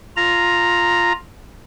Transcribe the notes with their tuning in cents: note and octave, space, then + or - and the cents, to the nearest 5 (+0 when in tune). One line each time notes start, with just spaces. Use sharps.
F4 +0 A#5 +0